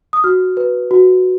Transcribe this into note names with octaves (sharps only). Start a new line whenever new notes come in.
D#6
F#4 F6
B4
F#4